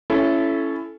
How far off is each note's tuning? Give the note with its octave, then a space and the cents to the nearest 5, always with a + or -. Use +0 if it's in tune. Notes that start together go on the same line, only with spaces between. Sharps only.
C#4 +0 E4 +15 A4 -15